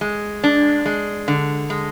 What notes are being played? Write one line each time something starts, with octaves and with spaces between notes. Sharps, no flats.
G#3
D4
G#3
D3
G#3